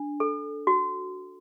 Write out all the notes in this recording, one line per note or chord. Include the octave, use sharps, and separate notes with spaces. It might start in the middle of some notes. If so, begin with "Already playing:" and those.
Already playing: D4
A4
F#4